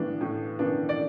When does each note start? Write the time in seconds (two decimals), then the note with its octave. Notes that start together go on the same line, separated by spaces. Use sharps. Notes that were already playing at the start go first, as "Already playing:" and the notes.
Already playing: A2 E3 B3 D4
0.21 A2
0.59 E3 B3 D4
0.89 D5